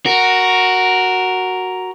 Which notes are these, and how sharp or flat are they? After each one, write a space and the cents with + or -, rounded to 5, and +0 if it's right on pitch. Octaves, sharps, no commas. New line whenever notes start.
F#4 +0 A#4 +0